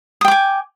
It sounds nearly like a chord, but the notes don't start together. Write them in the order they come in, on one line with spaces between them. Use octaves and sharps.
D#6 G5 D6 G#5